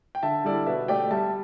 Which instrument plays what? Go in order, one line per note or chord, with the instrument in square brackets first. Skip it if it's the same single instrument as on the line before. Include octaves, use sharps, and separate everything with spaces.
[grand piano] G5
[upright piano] D3 [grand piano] E5 A5
[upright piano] G3 E4 A4 D5
[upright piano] B2 [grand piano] B4 E5
[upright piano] A3 G4 [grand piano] D5 G5
[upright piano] G3 [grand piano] E5 A5